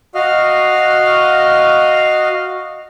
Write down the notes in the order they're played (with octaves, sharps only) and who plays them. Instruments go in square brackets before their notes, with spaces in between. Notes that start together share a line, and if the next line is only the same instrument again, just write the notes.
[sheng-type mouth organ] F#4 D#5 F5 F6